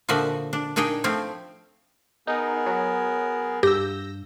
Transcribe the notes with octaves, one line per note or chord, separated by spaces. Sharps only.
A#2 D3 F3 F#4 E5
D4
A#2 D4 D#4 G#4 G5
F3 A3 C4
B3 D#4 G#4 A#4
F#3
G2 G4 E6 G6 A#6